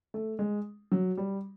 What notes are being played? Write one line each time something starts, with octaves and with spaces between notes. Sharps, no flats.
A3
G#3
F#3
G3